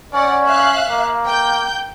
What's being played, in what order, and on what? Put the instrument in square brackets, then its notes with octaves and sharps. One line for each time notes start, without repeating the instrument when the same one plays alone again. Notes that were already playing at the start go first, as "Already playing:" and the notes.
[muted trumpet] C#4 [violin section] D5 F#5
[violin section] E5 F5 F#6
[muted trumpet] A#3
[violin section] G5 G6